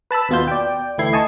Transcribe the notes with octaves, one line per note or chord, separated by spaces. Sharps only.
B4 A5 B5 E6
D#2 B2 B3 F4 G6
D5 G5
D2 E3 A3 E4 G#6 C7
D#5 G#5 A5 C#6